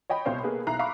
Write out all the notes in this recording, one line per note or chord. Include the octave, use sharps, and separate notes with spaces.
C#5 D#5 G5 B5
C2 B2 C5 C#5 F5
A#3 B3 G#4 A4 B4
B1 E4 A#5 F#6 C7
E5 F5 A#5 B5 C#6 D6